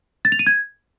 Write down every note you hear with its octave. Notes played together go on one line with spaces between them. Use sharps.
A6
F7
D#7
G#6